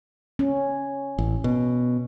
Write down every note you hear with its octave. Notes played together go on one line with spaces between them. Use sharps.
C#4
A1
B2